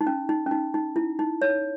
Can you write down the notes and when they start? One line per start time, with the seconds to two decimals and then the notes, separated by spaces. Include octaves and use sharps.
0.01 D#4
0.07 C#4
0.29 D#4
0.46 C#4
0.51 D#4
0.74 D#4
0.96 E4
1.19 D#4
1.42 C#5